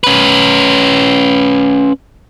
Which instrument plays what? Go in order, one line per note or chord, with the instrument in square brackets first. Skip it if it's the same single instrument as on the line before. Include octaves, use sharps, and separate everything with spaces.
[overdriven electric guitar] C#4 B4